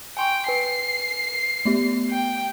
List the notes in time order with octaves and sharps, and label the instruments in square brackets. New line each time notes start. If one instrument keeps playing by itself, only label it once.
[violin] G5 [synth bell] G#5 C6 C#6
[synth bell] B4 G#5 [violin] C7
[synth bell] A3 B3 G4
[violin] G5